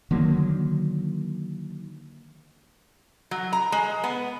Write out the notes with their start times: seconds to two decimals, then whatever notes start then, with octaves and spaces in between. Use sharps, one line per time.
0.11 D3 D#3 F#3 A#3
3.31 F#3
3.53 A#5
3.72 G#3
4.04 B3